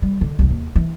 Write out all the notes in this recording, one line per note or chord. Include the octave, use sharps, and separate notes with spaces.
G3
D3
C2 D#4
D#2
E3